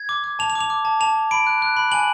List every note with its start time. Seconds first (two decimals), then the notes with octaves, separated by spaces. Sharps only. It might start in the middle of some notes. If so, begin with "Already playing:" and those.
Already playing: G#6
0.09 D6
0.24 D6
0.39 A5 F7
0.50 F7
0.55 D6
0.61 F7
0.70 D6
0.85 A5
1.00 A5 F7
1.16 A5
1.31 B5 D7
1.47 F#6
1.62 F#6
1.77 B5
1.92 G#5 F#7